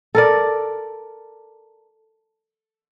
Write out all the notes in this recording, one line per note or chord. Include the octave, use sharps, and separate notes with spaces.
A4 A#4 D5